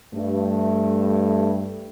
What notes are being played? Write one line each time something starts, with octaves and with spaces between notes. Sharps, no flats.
G2 A3